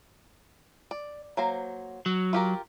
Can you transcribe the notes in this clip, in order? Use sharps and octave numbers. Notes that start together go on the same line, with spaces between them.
D5
F#3 A#3 C5
F#3
F4 G4 A#4